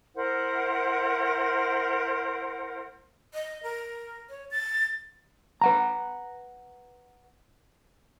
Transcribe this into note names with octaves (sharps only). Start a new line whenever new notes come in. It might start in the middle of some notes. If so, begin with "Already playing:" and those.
E4 A#4 C5 F#5
D#5
A#4
C#5
A6
B4 F#5 A#5